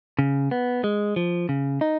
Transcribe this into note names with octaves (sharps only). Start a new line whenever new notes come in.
C#3
B3
G#3
F3
C#3
D#4